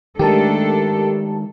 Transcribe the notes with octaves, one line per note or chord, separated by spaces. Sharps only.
D#3 G#3 A3 D4 G4 A4 A#4 A5